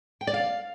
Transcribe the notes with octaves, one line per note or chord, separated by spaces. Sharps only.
G5
D5
F5